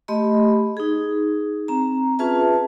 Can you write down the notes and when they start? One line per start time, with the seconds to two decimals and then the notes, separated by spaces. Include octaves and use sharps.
0.08 A3 G4 D#5 B5 C6
0.77 D#4 G#4
1.68 C4 A#5
2.19 C#4 F4 G#4 B4 E5 A5